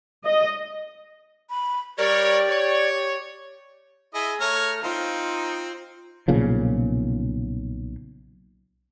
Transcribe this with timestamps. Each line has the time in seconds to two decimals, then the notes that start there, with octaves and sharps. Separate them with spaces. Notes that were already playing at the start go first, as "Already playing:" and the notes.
0.25 D#5
1.50 B5
1.98 G3 G4 A#4 C#5 D5
2.50 C#5
4.15 E4 G#4 D#5
4.41 A3 C#5 A#5 F6
4.83 C4 D#4 F4 F5
6.28 B1 A#2 C#3 F3